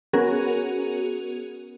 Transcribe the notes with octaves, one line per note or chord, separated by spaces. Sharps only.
B3 C#4 F#4 G#4 A#4